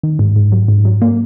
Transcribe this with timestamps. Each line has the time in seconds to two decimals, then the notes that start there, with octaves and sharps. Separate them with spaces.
0.03 D#3
0.19 G#2
0.36 G#2
0.52 F#3
0.68 G#2
0.85 F#3
1.02 A#3